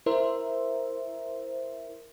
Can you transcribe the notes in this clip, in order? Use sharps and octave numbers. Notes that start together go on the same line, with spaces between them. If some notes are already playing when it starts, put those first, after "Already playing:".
E4 A#4 C5 E5